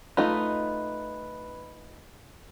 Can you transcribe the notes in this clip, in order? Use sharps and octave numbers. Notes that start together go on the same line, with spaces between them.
A3 D#4 F4 B4